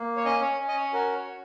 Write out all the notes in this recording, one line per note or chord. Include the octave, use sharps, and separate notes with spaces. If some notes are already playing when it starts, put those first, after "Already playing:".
Already playing: A#3
C#5
C#4 D#5
C#5
C#4
D#5
C#5
F#4 A#4
C#5
F#4